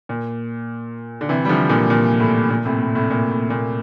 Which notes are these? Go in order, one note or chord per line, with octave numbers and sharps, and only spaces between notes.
A#2
D3
C3 E3
G3
D3 F3
A#2 D3
A#2
A2
A#2
A2 C3
A2
A2 C3
A#2
A2
A#2